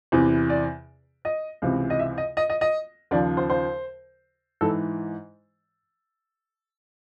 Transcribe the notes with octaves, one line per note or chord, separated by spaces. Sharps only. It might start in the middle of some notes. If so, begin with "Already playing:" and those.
E2 C3 E3
D5
D#5
C#2 C3 E3
D#5
E5
D#5
D#5
D#5
D#5
D#2 C#3 F3 D5
C5
C5
G#2 E3 A4